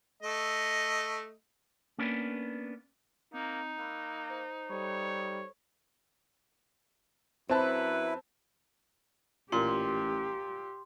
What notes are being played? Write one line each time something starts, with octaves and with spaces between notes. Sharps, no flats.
A3 D#5
A#3 B3 C#4 D4 A#4 B4
A#3 C4 D#4
A#3 B5 E6 F#6
C5
G3 A4 C5 C#5 B5
F#2 C4 E4 B4 A5
A1 A#2 G4 C6